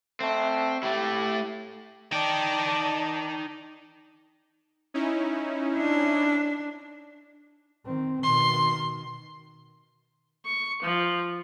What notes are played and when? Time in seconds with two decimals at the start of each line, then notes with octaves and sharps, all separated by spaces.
0.20 A3 C4
0.83 A3 E4 G4
2.12 D#4 D5 G5 A5
4.94 C#4 D#4 E4
5.77 D4
7.86 D#3 C4
8.23 B2 D#3 C6
10.46 C#6
10.83 F3